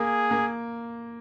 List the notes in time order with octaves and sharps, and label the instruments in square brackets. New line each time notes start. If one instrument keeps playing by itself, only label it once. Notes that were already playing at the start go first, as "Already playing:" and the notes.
Already playing: [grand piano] A#3 [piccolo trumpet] G#4
[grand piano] A#3